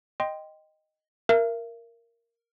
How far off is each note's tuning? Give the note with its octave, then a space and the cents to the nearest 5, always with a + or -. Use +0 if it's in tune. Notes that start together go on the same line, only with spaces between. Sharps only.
D#5 +0 G5 +0 C6 -10
A#4 +0 E5 +40